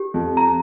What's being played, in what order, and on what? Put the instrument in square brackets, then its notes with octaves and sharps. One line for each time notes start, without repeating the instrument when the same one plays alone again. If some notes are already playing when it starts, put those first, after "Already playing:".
Already playing: [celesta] G4
[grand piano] F2
[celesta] A#5